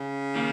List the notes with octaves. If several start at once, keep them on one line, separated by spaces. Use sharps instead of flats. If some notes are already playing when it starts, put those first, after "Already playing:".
Already playing: C#3
D#3 A#3